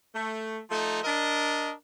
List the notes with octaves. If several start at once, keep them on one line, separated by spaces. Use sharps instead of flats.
A3
F3 A3 D#4
D4 A#4 D#5